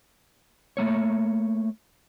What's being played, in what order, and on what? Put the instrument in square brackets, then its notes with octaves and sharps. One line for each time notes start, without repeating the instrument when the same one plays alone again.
[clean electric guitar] A3 A#3 C#5